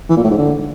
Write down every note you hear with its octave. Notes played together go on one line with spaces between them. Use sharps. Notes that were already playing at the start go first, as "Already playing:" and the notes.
E3
A#2
A2
G#2
D3